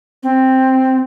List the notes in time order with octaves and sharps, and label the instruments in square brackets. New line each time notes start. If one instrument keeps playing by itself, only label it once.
[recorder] C4